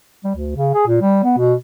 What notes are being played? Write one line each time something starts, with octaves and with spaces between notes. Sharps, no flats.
G3
D2
C#3
G#4
A#2
G3
B3
B2